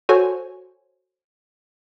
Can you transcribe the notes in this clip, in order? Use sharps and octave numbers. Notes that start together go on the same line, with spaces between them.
F#4 A4 C5 C#5 G#5 C#6